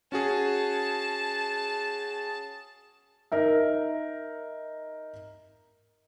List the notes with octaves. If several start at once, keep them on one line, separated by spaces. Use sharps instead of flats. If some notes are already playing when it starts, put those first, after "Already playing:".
C#4 F#4 G#4 A5
D#4 A#4 E5